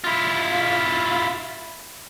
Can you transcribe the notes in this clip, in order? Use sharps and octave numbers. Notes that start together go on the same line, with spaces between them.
E4 F4